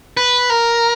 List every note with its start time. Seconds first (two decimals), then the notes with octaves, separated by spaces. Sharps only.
0.17 B4
0.50 A#4